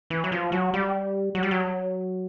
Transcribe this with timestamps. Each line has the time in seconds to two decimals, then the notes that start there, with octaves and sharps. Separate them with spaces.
0.10 E3
0.24 F#3
0.32 F3
0.52 F#3
0.74 G3
1.35 F#3
1.43 G3
1.51 F#3